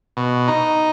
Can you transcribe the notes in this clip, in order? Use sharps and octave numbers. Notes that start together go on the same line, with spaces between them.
B2
D#4